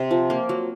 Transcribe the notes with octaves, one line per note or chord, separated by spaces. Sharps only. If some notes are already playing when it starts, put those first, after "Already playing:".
Already playing: C3 C4 C5
F3
A#3
F#3